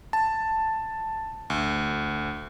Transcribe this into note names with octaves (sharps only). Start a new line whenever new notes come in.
A5
D2